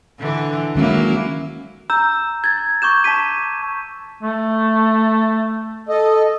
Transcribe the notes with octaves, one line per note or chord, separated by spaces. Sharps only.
D3 E3
D#3 F#3 G#3 A#3 C#4 E4
A#5 E6 G6
G#6 A6
C#6 D6 G6 E7
A5 C#6 B6 D#7
A3
A4 D#5